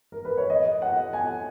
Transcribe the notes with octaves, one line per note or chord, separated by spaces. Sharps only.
A#4
B4
C#5
D#5
F#5
G#5